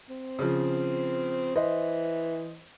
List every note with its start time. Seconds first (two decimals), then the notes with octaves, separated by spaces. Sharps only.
0.09 C4
0.39 C#3 F3
1.56 E3 C5 D#5